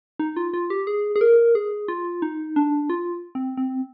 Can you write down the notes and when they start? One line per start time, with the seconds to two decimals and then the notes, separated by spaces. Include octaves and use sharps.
0.19 D#4
0.36 F4
0.54 F4
0.70 G4
0.87 G#4
1.16 G#4
1.21 A#4
1.55 G#4
1.88 F4
2.22 D#4
2.56 D4
2.90 F4
3.35 C4
3.57 C4